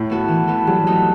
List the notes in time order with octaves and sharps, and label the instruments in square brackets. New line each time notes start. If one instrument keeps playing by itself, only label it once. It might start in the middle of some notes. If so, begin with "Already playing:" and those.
Already playing: [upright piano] A2
[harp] B3 F#4 A4
E3
B3 F#4 A4
[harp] F#3 [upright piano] G3
[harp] A3 D#4 F#4 A4